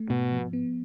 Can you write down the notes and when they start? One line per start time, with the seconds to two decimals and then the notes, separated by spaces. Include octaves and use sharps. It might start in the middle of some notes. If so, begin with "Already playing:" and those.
Already playing: A3
0.10 G#2 B2
0.32 F3
0.53 B3